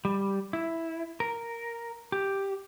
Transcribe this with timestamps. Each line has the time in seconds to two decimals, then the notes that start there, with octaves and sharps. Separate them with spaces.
0.05 G3
0.53 E4
1.20 A#4
2.12 G4